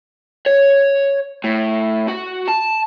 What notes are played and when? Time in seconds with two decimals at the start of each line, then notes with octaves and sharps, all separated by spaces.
0.46 C#5
1.44 A2
2.08 F#4
2.48 A5